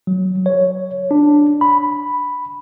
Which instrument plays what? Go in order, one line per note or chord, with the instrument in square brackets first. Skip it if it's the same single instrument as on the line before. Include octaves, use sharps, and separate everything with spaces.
[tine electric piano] F#3
C#5
D4
B5